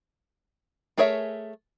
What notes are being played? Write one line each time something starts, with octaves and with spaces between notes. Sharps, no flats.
A3 G#4 A#4 C#5 E5